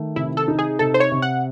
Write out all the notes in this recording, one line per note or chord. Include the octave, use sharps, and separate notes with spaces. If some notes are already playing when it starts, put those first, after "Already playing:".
Already playing: D#3 A3
C3 E4
A4
D#4
G#4
C3 A4
C5
C#5
C3
F#5